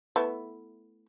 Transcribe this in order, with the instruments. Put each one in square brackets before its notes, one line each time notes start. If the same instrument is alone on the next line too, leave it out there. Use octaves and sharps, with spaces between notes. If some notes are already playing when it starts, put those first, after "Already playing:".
[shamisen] A3 B3 E4